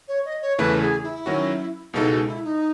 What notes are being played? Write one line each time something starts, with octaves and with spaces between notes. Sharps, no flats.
C#5
D#5
C#5
E2 C#3 E3 A3 E4 B4
G#4
E4
D#3 F#3 C#4 F#4
C#2 B2 G#3 D#4 E4 A4
F#4
D#4
E4
D#4